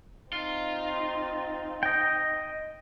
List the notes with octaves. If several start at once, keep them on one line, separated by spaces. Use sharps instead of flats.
C4 D#4 F4
D#5 G5